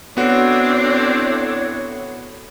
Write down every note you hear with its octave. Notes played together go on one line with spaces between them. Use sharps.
A2 B3 C4 D4 F#4 C#5